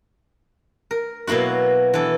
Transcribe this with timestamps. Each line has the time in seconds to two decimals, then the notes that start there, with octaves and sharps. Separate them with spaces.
0.91 A#4
1.27 B2 F#3 A#3 E4 F#4
1.94 E3 D4 E4 A4